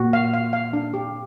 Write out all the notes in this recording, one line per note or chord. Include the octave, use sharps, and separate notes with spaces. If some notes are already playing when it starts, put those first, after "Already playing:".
Already playing: A#2 A#3 F#4
F5
F5
F5
D4
G4